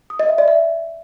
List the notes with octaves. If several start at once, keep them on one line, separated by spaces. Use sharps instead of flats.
D#6
D#5
E5
D5
E5